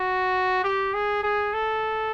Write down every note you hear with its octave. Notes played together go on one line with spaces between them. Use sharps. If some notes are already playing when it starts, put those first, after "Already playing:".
Already playing: F#4
G4
G#4
G#4
A4